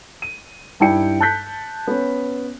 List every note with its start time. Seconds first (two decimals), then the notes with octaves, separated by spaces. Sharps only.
0.22 D#7
0.80 G2 D#4 E4 G5 C#7
1.20 A5 F#6 G6 B6
1.87 B3 C#4